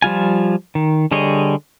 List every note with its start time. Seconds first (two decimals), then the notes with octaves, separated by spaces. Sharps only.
0.02 F3 G3 F4 G#5
0.75 D#3
1.11 D3 G3 G#4 C#5 D#5